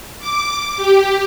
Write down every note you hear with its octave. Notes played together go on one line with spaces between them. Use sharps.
D6
G4